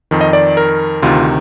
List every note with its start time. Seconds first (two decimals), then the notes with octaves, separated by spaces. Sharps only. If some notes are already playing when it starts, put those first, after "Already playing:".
0.11 F2 D#3
0.21 D#5
0.33 D5
0.57 A#4
1.02 D2 C3 D#3 F4